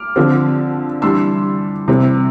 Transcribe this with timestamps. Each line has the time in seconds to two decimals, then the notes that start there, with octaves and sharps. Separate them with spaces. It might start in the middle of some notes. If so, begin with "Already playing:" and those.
Already playing: D6 F6
0.16 D3 F3 C4
1.02 E3 G3 D4 C6 E6
1.88 C3 E3 G3 C4